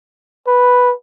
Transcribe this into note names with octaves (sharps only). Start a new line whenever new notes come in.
B4